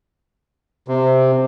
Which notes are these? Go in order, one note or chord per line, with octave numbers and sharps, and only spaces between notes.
C3